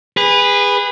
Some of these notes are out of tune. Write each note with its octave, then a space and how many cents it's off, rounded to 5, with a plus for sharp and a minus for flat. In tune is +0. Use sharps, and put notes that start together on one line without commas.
G#4 -30 B4 +0